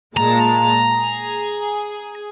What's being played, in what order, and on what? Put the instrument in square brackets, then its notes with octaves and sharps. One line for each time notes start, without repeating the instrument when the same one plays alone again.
[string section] A#2 G#3 A5 [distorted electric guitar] A#5
[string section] G#4